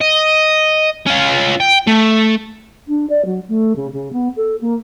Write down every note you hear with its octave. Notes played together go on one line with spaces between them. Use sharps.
D#5
C#4 F4
G5
A3
D4
D5
F#3
A3
C#3
C#3
B3
A4
A#3